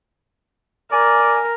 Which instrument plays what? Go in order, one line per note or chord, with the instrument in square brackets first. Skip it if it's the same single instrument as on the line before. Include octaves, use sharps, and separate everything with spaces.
[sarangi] A#4 [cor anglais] D5 [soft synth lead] G#5